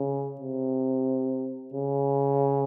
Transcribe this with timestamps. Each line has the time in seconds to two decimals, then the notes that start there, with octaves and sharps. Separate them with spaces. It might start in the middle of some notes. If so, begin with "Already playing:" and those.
Already playing: C#3
0.41 C3
1.74 C#3